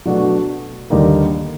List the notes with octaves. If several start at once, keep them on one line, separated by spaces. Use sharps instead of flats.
B2 F#3 A3 D4 F#4
D#2 D3 G3 A#3 D#4